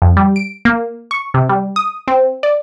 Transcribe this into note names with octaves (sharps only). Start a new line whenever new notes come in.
F2
G3
D7
A#3
C#6
C3
G3
D#6
C4
D5